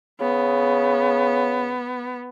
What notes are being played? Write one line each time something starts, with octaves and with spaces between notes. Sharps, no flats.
C#3 B3